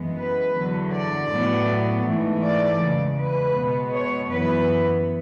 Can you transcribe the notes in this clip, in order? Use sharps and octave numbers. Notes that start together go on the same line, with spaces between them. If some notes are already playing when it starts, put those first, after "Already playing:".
Already playing: F#2 E3 G#3 B3
B4
E2 D3 F#3
D5
A2 F#3 B3
G#2 E3 A3
D5
E2 C#3 G#3
B4
B2 G#3 B3
C#5
F#2 E3 B3 B4